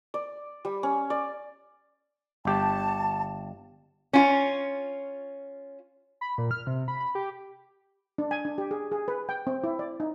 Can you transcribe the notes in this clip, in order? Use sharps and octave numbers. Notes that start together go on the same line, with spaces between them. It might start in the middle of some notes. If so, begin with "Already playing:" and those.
D5
G3
C#4
D5
G1 G4 A5
C#4 F4
B5
A#2
F6
C3
B5
B5
G4
D4
G#5
D4
G4
G#4
G#4
B4
G5
C4
E4
D5
D#4